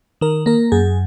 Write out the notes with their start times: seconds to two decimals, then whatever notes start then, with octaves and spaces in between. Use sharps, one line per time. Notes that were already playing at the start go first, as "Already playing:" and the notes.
0.21 D#3 A#4
0.46 A#3 A#4
0.72 F#2 G#4